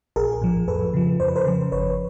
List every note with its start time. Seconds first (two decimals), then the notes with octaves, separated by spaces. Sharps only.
0.16 A#1 G#4 A#4
0.42 A2 F3
0.68 F2 A4 B4
0.94 C#3 F3
1.20 F2 C5
1.28 B4
1.36 A#4 C5
1.46 C#3 F3
1.72 G1 B4 C#5